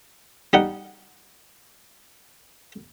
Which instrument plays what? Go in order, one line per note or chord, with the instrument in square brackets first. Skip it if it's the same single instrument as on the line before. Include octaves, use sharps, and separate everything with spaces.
[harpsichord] G3 D#4 F#5